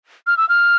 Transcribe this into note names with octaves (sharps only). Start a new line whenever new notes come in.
F6
E6
F6